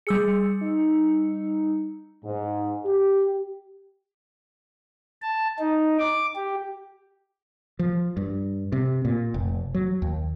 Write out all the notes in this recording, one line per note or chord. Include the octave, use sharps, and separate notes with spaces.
G3 G#4 E6 C#7
D#4
G#2
G4
A5
D#4
D6
G4
F3
G2
C3
A#2
F1
F#3
D#2